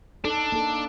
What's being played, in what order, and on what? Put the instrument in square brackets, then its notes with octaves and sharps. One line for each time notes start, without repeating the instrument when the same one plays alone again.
[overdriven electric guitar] D4 [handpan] D#4 A4
[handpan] A#3 D#4 A4